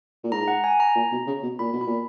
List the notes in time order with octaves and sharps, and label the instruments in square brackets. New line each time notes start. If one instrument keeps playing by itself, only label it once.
[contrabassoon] A#2
[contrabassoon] G#2 [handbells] A#5
[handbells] F#5
G#5
A#5
[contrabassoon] A#2
B2
C#3
B2
[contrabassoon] A#2 [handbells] B5
[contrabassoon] B2
[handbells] B5
[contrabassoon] A#2